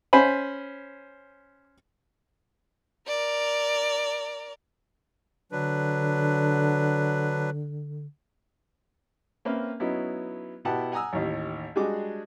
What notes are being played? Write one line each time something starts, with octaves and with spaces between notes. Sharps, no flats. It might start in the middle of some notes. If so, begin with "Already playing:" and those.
C#4 C5 G#5 B5
A#4 D5
D3 F#3 D4 B4
A#3 C4 C#4 B4 E5 F6
F#3 B3 C#4 D#4 E4
B2 B3 E4 G4 F#5 A5
F#5 G#5 A#5 D#6 E6
A1 D#2
G3 G#3 D4 F#4 G#4 D6